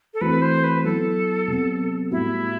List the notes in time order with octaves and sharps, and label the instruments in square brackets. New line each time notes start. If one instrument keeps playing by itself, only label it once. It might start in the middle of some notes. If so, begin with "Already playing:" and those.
[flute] A4
[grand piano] E3 A3 C4 F#4 [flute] B4
[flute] C5
B4
[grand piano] F#3 B3 E4 [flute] A4
[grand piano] C3 F#3 B3
[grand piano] A2 G3 B3 F#4 [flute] E4